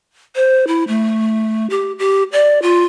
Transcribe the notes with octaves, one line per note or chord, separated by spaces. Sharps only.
C5
E4
A3
G4
G4
D5
F4